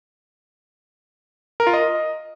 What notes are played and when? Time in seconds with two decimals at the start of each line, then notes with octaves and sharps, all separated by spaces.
1.60 A#4
1.67 F4
1.74 D#5